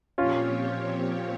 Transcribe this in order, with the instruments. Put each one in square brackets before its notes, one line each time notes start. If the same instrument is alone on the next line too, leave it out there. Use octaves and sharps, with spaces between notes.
[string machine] A#2 F3 C4 G4 C#5 [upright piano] C#4 F4